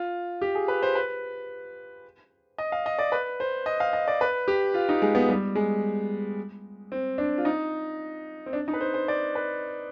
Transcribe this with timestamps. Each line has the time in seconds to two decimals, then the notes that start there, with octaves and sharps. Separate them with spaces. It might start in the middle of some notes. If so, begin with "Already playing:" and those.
Already playing: F4
0.42 G4
0.55 G#4
0.68 B4
0.83 C5
0.95 B4
2.58 D#5
2.72 F5
2.86 D#5
2.99 D5
3.12 B4
3.40 C5
3.66 D#5
3.80 F5
3.93 D#5
4.08 D5
4.21 B4
4.48 G4
4.74 F4
4.89 D#4
5.02 G#3
5.15 B3
5.29 G3
5.55 G#3
6.92 C4
7.18 D4
7.38 F4
7.45 D#4
8.46 C4
8.53 D4
8.68 D#4
8.74 B4
8.81 C5
8.94 C5
9.08 D5
9.35 B4